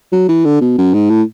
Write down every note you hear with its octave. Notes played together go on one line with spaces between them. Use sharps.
F#3
E3
D3
B2
F#2
G#2
A2